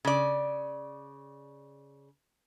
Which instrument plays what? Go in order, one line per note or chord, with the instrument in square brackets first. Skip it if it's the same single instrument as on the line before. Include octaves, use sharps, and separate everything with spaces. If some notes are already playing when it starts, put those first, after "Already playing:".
[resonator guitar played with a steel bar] C#3 D5